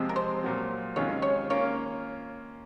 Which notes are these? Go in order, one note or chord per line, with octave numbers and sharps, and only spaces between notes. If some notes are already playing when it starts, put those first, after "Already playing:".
Already playing: C3 F3 G#3 C4
A#4
C5
A#2 F#3 C4
C3 D#3 G#3 C#4 F4 C#5
C#5
A#3 C#4 F4 C#5